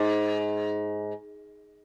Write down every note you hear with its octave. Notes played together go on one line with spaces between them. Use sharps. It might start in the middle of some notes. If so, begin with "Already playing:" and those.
Already playing: G#2